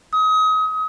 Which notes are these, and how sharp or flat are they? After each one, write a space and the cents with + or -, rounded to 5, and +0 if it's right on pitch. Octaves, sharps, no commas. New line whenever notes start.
D#6 +30